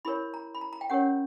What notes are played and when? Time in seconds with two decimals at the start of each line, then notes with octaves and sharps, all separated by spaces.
0.05 E4 G4 A#4 C#5 B5
0.34 A#5
0.55 B5
0.61 A#5
0.73 A#5
0.81 G5
0.90 C#4 G4 A#4 C#5 F#5